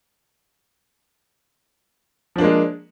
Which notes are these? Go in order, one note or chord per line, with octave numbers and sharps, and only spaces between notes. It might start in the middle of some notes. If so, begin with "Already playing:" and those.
F3 G#3 A#3 D4